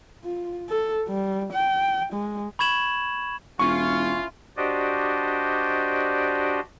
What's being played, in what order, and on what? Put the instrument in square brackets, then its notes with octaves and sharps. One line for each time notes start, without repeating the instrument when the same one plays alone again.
[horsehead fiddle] F4
A4
G3
G5
G#3
[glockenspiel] B5 C#6 G#6 E7 F#7
[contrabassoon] E1 [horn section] C#4 E4 F4 [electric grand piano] C#6
[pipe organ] D4 F#4 G4 C5 D5 D#5